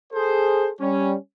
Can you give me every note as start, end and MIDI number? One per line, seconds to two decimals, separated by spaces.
0.13 0.70 68
0.13 0.70 69
0.13 0.70 72
0.81 1.15 55
0.81 1.15 61